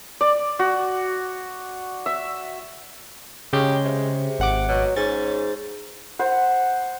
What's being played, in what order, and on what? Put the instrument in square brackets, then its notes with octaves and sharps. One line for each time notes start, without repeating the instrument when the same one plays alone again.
[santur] D5
F#4
E5
[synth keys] C#3 [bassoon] G#3 [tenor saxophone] G4
[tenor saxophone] C3
[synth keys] G#1 F#5 D6
[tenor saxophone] B2 [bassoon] F#3
[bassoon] G#2 [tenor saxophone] C#4 [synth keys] A6
[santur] C5 F#5